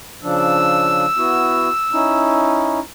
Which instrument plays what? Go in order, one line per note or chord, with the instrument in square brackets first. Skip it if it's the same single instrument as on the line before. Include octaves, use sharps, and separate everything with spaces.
[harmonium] C#3 F3 D4 [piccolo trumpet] E6
[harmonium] B3 E4 F#4
C#4 D#4 E4